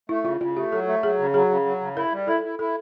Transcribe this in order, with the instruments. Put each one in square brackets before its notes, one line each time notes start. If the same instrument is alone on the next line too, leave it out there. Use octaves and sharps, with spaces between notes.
[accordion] A3 [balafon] E4
[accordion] C#3 [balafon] F4
[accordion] C#3 [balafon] F4
[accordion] A3 [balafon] G4
[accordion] F#3 [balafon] A4
[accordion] A3
[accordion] F#3 [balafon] G#4
[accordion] C#3
[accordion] F#3 [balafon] G#4
[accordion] C#3
F#3
C#3
[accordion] E4 [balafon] A#4
[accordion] G3
[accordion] E4 [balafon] A4
[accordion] E4
[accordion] E4 [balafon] A4